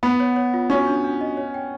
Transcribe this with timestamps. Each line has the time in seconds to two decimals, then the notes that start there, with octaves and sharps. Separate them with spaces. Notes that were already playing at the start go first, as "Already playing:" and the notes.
0.03 B3 F#5
0.20 C#5
0.36 C#5
0.54 F4
0.70 C#4 F#4
0.87 D4
1.04 D4
1.21 D#5
1.37 C#5
1.54 G5